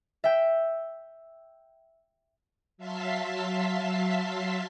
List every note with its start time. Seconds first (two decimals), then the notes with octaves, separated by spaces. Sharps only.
0.24 E5 G5
2.78 F#3 E5 F5 A5 C6 B6